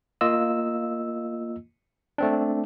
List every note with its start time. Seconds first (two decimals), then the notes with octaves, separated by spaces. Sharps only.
0.21 A#3 F4 D#5 E6
2.18 A3 C4 D4